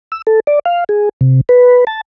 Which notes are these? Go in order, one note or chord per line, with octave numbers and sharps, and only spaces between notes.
E6
A4
D5
F5
G#4
C3
B4
A5